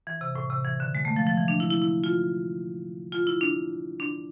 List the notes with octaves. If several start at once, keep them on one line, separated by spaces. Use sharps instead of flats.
E3
C3
A2
C3
E3
D3
G#3
A3
F3
F3
E3
D4
E4
E4
E4
F4
F4
E4
D4
D4